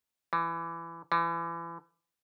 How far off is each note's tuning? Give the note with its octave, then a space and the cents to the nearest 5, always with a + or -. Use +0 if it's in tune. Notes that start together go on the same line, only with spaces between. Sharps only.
E3 +20
E3 +30